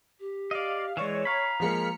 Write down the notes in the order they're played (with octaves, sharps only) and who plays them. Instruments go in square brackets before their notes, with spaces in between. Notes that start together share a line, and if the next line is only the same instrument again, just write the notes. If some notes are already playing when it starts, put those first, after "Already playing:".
[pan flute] G4
[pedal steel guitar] D5 D#5 [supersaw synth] F5
[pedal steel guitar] E3 G#3 [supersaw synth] C#5 [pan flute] D5
[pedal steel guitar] F5 B5 [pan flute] A#5
[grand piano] F3 G#3 A#3 [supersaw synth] F6 B6 C#7